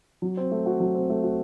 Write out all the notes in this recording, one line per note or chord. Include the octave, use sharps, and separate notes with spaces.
F#3
C4
A3
F#4
F#3
C4
A3
F#4